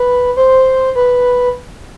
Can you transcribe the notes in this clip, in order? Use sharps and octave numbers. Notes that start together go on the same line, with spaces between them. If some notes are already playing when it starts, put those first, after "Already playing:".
Already playing: B4
C5
B4